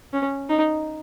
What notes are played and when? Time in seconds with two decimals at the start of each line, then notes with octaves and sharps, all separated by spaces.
0.13 C#4
0.49 D#4